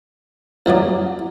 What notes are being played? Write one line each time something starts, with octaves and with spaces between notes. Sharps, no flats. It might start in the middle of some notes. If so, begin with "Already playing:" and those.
A1 E3 F#3 D5